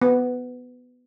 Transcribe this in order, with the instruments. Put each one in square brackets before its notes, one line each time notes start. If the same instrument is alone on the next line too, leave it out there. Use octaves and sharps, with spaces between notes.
[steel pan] B3